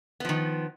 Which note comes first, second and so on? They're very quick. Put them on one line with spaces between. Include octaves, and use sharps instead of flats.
B3 F3 D#3